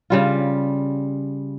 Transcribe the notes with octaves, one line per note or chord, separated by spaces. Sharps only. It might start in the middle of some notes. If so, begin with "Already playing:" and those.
C#3 G3 F4